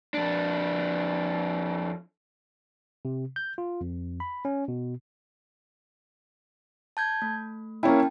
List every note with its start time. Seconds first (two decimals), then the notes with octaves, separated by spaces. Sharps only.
0.14 F2 D4
3.05 C3
3.36 G6
3.58 F4
3.81 F2
4.20 B5
4.45 C#4
4.68 B2
6.97 A5 G6 G#6
7.22 A3
7.83 A#3 C#4 E4 G5 A5